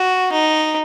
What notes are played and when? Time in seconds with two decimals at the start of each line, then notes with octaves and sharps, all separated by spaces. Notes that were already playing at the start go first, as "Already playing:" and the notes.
Already playing: F#4
0.32 D#4